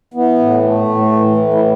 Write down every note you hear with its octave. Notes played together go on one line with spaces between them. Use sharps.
E3 B3
A2
A3
A2
E3
A2
E4